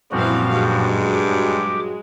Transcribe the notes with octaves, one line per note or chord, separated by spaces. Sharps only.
F#2 A#2 E3 F3 G3 C4 F#4 F5
G2 F#3 G#3
G4 D6